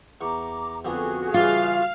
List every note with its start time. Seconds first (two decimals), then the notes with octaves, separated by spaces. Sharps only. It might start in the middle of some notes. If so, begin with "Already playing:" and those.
0.21 E2 A#5 C#6 D6
0.85 F2 D3 B3 F#4 G#4
1.34 C#3 E3 G3 F4 F5